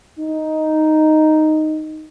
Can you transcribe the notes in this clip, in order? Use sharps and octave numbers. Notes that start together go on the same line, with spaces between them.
D#4